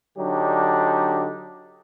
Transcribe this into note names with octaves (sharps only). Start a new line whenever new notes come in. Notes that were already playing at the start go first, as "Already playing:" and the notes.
D3 F#3 D4 D#4 G4